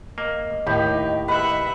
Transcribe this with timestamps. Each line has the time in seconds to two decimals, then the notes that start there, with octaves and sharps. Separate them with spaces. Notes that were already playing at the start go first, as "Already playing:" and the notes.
0.18 A#3 D#5
0.67 D#2 A2 D#4 G4
1.28 B4 E5 F#5